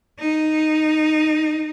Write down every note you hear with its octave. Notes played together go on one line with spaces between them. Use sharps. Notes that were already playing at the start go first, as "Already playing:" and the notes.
D#4